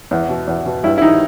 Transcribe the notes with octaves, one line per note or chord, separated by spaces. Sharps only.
E2
B2
E2
B2
G2 E4
E4
D#3 D#4